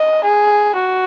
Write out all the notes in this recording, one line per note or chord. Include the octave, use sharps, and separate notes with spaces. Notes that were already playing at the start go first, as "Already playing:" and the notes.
Already playing: D#5
G#4
F#4